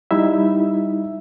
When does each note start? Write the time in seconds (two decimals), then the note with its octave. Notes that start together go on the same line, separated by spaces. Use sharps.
0.11 G3 D#4 E4 E5